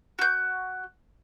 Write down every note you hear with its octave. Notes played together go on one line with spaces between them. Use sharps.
F#4 G6